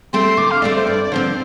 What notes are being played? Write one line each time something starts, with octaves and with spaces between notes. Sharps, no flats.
A3 C4 G4 C6
D3 D6
F5
A3 C4 G4 D5
C5
G2 D5
D5
D3 F3 C4 C5